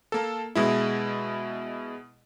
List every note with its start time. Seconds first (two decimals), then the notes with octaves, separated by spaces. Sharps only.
0.12 A#3 A4
0.55 B2 G#3 E4